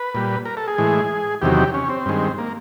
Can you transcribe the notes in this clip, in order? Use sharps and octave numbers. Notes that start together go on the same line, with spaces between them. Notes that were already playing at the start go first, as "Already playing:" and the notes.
Already playing: B4
A#2 G3
A#4
A4
G#4
A2 E3 G#3
E2 C3 D#3 F#3 G4
C#4
C4
G2 D#3 G#3
A#3